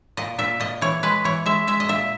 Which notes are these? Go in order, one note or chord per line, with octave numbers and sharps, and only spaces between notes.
A#2 D#5
A#2 E5
A#2 D#5
E3 C#5
G#3 B4
E3 C#5
G#3 E5
G#3 E5
D#5
A#2 E5